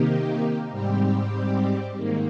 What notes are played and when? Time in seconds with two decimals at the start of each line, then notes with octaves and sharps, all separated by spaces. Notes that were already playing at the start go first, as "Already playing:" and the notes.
Already playing: C3 D#3 A#3 D#4 G4
0.71 G#2 G3 C4 G4
1.97 G#2 D#3 A#3